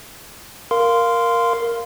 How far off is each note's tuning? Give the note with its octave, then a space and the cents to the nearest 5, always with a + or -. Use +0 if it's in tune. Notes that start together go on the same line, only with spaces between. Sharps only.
A#4 +0 F5 +0 C6 -15